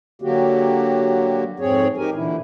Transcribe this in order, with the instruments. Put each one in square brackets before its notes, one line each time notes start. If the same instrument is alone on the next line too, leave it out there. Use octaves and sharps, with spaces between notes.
[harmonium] D3 F#3 A#3 F#4 G4
F2 G#2 C4 G#4 C#5
D#4 G4 A#4 G#5
A#2 D3 E3 E4